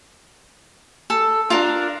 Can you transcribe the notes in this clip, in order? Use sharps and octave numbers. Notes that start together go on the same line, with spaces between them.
A4
D4 F4 A#4